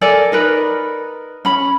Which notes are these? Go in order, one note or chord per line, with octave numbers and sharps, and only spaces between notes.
A4 A#4 D5 G#5
D#4 A#4 B4
C#4 B5